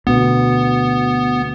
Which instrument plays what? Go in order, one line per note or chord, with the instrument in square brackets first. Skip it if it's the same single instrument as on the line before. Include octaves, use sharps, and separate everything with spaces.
[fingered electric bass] D2 B2 [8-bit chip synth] B3